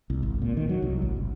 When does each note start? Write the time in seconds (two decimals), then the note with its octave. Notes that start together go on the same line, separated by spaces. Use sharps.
0.10 C2
0.23 G#1
0.42 A#2
0.57 D#3
0.69 F#3
0.82 C2
1.02 A1
1.16 G1